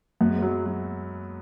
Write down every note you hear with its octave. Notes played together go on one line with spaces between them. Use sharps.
F#2 B3
G#3
F#3 B3
F#3